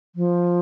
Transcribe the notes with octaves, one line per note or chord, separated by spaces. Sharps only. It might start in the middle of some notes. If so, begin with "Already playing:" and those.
F3